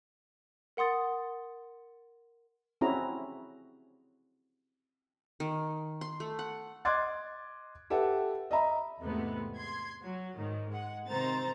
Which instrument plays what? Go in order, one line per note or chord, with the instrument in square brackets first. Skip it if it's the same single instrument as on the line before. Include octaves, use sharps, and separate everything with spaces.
[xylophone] A#4 F#5 C6 D#6 A6
[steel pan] C4 C#4 E4 F#4 G#4 A#5
[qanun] D#3
C6
A3
F#5
[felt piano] D#5 C6 D6 F#6 G#6 A6
G4 A4 B4 E5 F#5
D#5 E5 A#5 B5
[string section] E2 G#2 C3 G#3 A3 B3
C6 G#6
F#3
G#2 D#3
G#3 F#5
C3 D#3 C4 C5 A#5 A6